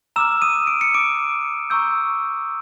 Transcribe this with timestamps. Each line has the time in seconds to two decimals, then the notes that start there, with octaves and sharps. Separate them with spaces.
0.16 A#5 D6 E6 F6 E7
0.42 D#6 D#7
0.67 D7
0.81 C#7
0.94 D6 D7
1.70 A#5 C#6 E6 G6